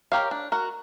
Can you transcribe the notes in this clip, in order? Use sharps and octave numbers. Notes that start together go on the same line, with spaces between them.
G4 A#4 C#5 F5
D4
F#4 A#4